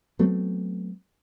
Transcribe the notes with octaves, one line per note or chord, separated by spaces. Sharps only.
F#3 A3 B3 C4